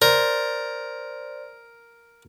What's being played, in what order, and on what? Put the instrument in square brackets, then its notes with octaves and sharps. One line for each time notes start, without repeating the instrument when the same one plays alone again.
[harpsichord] A#4 [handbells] C5 D5 C6